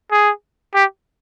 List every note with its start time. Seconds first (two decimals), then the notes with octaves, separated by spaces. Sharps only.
0.11 G#4
0.75 G4